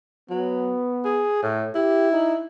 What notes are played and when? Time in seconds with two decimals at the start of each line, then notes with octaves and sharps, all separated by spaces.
0.30 F#3 B3
1.04 G#4
1.43 A2
1.75 E4 G4
2.12 D#4